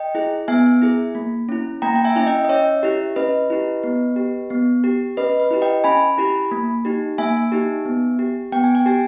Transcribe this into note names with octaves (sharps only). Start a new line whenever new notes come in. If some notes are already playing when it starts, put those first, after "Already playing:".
Already playing: D#5 G5
E4 G#4
B3 E5 G#5
E4 G#4
A#3
C#4 E4
A#3 G5 A#5
G5
E5 G#5
C#4 E4 E5
D#5 G5
D#5
C#4 C#5 E5
E4 G4
C#4 B4 D#5
E4 G4
B3
G4
B3
G4
C#4 B4 D#5
B4
E4 G4
D#5 G5
C#4 G#5 B5
E4 G4
A#3
D#4 G4
A#3 E5 G#5
D#4 G4
B3
G4
B3 G5
G#5
G5
G4 G#5